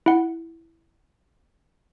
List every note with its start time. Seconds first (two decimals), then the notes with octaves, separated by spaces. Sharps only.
0.06 E4 F#5